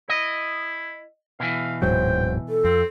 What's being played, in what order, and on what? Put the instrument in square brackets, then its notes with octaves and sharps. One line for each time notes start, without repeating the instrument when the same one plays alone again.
[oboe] E4 [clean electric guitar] D#5
[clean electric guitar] B2 E3 [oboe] F5
[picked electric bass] D1 G#2 F#3 [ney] C5 [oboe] G5
[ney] A4
[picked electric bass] F2 [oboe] C4